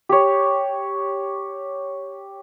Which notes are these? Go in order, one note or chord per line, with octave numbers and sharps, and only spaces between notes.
G4 C#5